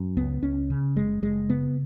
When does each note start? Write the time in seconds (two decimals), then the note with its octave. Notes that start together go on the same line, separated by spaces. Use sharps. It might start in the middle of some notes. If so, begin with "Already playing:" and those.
Already playing: F#2
0.17 C#2 B3
0.42 C#2 C#4
0.70 C#3
0.96 F#1 G#3
1.22 F#1 G#3
1.49 C#3 B3